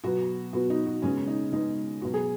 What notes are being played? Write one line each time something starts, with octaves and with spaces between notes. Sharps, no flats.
B2 F#3 B3 F#4
B2 F#3 B3 F#4
D#4
F#4
C#3 G#3 B3 C#4
D#4
C#3 G#3 B3 D#4
B2 F#3 B3 F#4
G#4